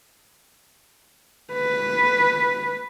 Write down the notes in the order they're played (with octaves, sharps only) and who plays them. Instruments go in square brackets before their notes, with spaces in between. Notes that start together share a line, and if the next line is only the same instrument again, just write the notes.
[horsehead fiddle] B4